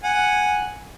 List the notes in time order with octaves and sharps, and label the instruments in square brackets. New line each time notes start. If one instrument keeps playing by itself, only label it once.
[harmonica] F#5 G#5